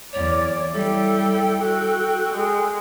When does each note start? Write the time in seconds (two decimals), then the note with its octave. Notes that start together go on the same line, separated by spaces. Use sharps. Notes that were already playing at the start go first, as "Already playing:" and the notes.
0.13 E2 C#5 D5
0.73 G3 E4 A4 G5
1.64 F#4 G5
2.34 G#3